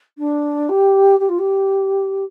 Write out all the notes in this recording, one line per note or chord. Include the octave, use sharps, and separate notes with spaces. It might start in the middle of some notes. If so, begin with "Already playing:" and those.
D4
G4
G4
F4
G4